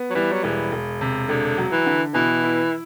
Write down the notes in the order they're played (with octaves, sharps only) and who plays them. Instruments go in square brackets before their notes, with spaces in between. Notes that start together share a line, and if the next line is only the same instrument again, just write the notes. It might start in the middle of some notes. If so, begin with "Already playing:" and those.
Already playing: [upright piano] B3
[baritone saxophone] F#3
[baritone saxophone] E3 [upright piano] G3
[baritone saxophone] F#3
[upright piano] E1 [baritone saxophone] E3
[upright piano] E1
C3
[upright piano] E1 [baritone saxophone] D3
[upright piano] F#3
[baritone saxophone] E3
[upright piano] D3
[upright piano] B2 [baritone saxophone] E3
[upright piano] E4